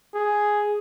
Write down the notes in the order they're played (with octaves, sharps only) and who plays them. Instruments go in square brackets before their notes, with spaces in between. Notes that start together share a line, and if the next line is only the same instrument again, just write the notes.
[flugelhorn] G#4